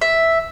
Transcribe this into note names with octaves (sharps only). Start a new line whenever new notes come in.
E5